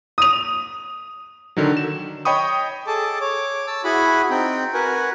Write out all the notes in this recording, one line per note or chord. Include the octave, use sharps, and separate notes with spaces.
D#6 F7
D3 D#3 F#3
E7
C#5 D#5 G5 B5 C#6 D#6
G#4 A4 A5 D6
C#5 D6
A5 E6
E4 F#4 G#4 F#5 G#5 B5
C4 D#4 G5
F#4 A#4 B4 F#5 G#5